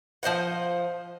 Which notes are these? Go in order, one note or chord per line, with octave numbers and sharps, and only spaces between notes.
F3 C5 D#5 F#5